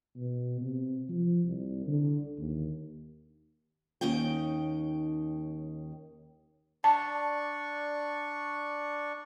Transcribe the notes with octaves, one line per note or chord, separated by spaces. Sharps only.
B2
C3
F3
C2
D3
D#2
D#2 C#4 D#4 G5
D4 D5 A5 C#6